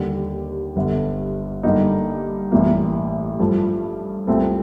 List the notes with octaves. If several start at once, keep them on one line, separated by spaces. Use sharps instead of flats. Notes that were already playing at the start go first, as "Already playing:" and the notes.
Already playing: D#2 D3 G3
G1 G2 D3
G2 D3 G3 A#3 D#4
A1 A2 G3 A#3
G2 F3 A3
C2 A#2 A3 C4